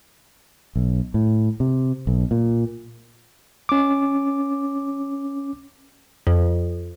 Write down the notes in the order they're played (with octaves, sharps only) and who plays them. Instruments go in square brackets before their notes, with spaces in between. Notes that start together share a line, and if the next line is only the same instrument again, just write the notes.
[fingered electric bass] B1
A2
C3
B1
A#2
[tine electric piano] C#4 D6
[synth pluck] F2